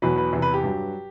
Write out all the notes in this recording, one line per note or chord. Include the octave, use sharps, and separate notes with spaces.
E2 B2 F#3 B4
B4
E2 C3 E3
B4
G4
G2 F#3